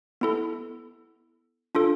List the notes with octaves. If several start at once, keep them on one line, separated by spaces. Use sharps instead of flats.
B3 E4 A4
D4 F4 A4